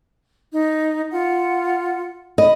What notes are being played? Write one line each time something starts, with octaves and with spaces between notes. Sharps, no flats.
D#4
F4 F#5
D#5 B5